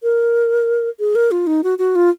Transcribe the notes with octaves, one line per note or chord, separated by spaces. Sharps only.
A#4
G#4
A#4
F4
D#4
F#4
F#4
F4